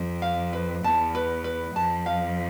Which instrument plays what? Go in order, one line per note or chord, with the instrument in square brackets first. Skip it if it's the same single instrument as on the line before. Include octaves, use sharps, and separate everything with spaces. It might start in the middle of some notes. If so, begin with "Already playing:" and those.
Already playing: [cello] F2
[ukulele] F5
B4
[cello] E2 [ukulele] A5
[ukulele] B4
B4
[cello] F2 [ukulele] A5
[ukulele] F5